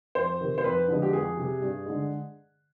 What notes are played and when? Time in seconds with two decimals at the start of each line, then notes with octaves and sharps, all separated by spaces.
0.15 F2 C5
0.40 C3 D#3
0.58 C5
0.64 F2 B4
0.88 D3 F3 G#3
1.02 G4
1.13 F2 G#4
1.37 C3 G3
1.62 G2
1.86 D3 G#3